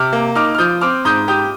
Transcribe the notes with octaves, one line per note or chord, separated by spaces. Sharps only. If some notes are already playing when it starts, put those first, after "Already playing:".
Already playing: C3 D6 F6
A#3
D#4 D6 F6
F6
F3 D#6 G6
C4 D6 F6
G#2 D#6 G6
G4 D#6 G6